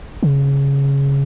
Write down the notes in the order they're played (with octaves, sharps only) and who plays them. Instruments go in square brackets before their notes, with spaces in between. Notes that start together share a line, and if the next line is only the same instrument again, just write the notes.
[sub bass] C#3